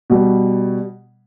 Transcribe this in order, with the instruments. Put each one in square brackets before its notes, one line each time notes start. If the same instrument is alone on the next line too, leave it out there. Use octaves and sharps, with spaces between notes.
[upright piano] B2 G3